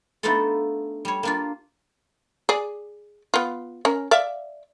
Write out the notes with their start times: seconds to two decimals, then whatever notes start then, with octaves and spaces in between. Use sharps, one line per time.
0.23 A3 B3 D4 D#4 F4 A4
1.05 G3 C#5
1.23 A#3 D4 F4
2.49 G#4 D5
3.34 B3 F4
3.85 C#4 A#4
4.11 D5 E5 F5